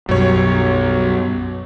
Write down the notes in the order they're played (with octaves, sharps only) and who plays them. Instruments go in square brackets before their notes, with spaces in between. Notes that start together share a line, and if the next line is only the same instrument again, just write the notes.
[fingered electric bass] B1 [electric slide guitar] F#2 G3 [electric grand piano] F#3 C#5